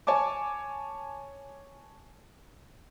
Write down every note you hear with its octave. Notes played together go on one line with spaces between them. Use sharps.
C#5 G#5 A5 D6